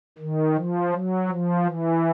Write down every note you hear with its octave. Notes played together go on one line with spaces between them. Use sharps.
D#3
F3
F#3
F3
E3